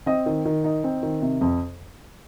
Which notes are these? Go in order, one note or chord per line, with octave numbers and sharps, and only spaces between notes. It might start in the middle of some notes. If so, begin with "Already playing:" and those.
C4 D#5
D#3
D#3
D#4
C4
D#3
C3
F2